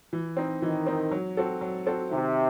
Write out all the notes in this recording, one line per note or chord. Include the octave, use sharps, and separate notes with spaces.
E3
C4 D#4
D#3 E3
C4 D#4
F#3
C4 F#4 A4
F#3
C4 F#4 A4
C3 D#3